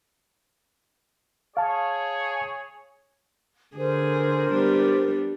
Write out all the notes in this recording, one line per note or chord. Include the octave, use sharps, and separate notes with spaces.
G#4 C#5 F5 A5
D3 G#4 A#4 C5
G3 B3 D4